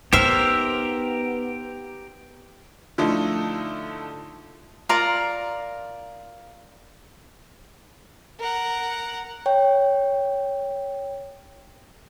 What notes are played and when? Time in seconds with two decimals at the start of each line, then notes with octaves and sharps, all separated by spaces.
0.13 B3 D#4 G4 A#4 C5 E5 F6
2.98 D3 F3 A3 D#4 E4
4.89 F4 A#4 D5 A#5
8.39 A#4 F#5
9.46 C#5 G5